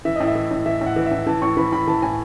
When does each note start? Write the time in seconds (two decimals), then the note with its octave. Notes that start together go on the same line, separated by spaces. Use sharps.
0.05 E3 E5
0.16 A2 D#5
0.27 E5
0.35 E3
0.51 A2
0.66 E3 E5
0.81 A2
0.86 F#5
0.96 E3
1.06 E5
1.11 A2
1.27 E3 A5
1.42 A2 C#6
1.57 E3 B5
1.72 A2 B5
1.88 E3 A5
2.02 A2 G#5